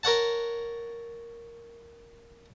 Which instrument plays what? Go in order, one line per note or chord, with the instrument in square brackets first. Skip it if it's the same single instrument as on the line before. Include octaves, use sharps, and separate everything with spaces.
[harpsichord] A#4 C#5 F#5 A5